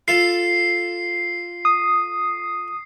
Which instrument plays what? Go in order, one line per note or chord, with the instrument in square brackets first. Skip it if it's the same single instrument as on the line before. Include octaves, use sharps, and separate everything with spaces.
[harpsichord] F4 A4 [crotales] C7
[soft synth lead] D#6